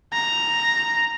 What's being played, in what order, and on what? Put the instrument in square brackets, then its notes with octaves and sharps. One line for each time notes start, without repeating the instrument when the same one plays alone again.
[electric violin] A#5